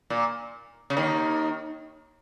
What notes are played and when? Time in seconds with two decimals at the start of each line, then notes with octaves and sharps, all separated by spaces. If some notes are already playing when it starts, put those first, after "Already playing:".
0.10 A#2
0.90 C#3
0.97 D#2 D#3